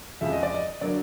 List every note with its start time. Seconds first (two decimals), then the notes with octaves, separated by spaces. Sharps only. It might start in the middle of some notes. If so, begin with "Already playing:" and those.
0.21 F2 C#3 F3 G#3 E5
0.32 D#5
0.43 D5
0.54 D#5
0.81 D3 F#3 A#3 D5